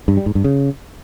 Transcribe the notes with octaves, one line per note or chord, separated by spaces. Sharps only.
G2
G3
G#2
G2
C#3